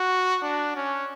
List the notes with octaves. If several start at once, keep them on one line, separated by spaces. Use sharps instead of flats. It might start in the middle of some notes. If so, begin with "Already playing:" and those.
Already playing: F#4
D4
C#4